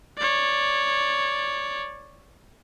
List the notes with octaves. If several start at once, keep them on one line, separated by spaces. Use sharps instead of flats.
C#5 D5